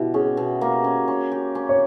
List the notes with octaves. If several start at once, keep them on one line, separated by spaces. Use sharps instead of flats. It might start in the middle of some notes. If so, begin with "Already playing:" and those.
Already playing: B2 E4 G4
C#4 G#4
B2
A#3
C#4
C#4
G4
C#4
C#5